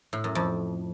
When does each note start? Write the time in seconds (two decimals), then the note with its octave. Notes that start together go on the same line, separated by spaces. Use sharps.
0.13 A2
0.24 F#2
0.35 F2